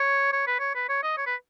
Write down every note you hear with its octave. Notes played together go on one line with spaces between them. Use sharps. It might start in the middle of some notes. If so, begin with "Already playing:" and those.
Already playing: C#5
C#5
B4
C#5
B4
C#5
D#5
C#5
B4